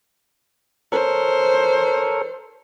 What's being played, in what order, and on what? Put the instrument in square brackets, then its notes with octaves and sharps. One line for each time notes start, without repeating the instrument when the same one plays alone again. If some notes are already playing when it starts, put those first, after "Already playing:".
[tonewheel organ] A4 A#4 C#5 [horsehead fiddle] C5